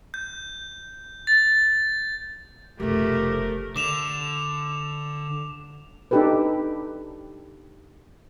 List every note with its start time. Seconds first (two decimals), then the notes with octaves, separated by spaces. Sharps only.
0.14 G6
1.27 A6
2.80 F1 B2 A3 G4 A#4
3.76 D3 D6 E7 F7
6.11 D4 D#4 G4 A4 B4